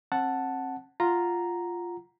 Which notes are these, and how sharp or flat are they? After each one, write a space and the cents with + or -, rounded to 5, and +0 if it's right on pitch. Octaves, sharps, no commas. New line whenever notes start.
C4 +35 F#5 +0 A5 +0
F4 +0 F#5 +0 A#5 +0